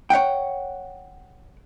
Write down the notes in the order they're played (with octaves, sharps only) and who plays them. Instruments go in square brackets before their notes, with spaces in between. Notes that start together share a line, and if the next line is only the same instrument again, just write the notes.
[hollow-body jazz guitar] C#5 E5 F#5 G5